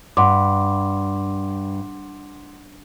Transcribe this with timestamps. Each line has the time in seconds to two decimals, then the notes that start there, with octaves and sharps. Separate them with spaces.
0.17 G2 F#5 C6 D6